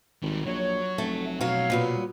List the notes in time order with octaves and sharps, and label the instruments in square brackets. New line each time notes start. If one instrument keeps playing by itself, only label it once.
[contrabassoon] G#1 [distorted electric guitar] D#3 G3
[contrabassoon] A#1 [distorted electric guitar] F#3 [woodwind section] C#5
[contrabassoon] F1 [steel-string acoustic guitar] A3
[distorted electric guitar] B1 B2 [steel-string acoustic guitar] F#3 C#5 [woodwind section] F5
[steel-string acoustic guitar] A#2 F#3 B3